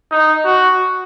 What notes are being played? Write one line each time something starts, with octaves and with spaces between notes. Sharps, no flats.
D#4
F#4